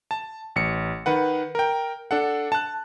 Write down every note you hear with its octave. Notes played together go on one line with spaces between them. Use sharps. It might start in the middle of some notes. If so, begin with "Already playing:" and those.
A5
A1 C#7
D#3 B4 F#5
A#4 G5
D4 A4 F#5
A5 F#6